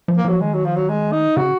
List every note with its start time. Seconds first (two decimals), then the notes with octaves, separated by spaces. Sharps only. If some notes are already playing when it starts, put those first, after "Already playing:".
0.08 F3
0.17 A#3
0.25 F3 F#3
0.40 D#3 G#3
0.53 F#3
0.65 F3
0.76 F#3
0.89 G#3
1.12 D#4
1.37 C#3 F#4